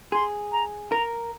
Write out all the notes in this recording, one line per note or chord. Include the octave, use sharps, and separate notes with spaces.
G#4 C6
A#5
A#4 A#5